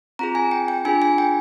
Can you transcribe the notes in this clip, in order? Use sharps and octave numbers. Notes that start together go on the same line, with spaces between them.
C4 F4 G#4 A#5
G#5
G5
G5
D4 F4 G#4 G#5
G#5
G5